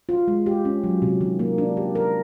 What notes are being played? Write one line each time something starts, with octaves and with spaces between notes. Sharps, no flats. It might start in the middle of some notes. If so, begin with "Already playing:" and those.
F4
G#3
G4
C#4
F#3
C3
D#3
A#3
D4
G4
A#4